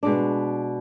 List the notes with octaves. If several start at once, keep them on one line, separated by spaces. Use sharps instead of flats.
B2 G#3 D4